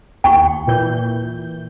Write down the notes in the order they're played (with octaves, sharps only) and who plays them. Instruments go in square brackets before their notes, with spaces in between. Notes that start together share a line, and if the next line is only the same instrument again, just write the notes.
[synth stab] D#2 [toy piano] G5 C#6
[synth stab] A#2 E3 G6